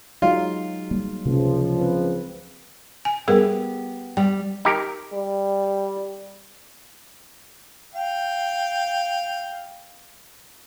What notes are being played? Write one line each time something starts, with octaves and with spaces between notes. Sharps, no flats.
F#3 G#3 D#4 F4
G3 A#3
C#2 C3 F3 A#3
C4 B4
G#5
G3 B3 G4 G#4 A#4
G3 G5
D#4 G4 A#4
G3
F5 G5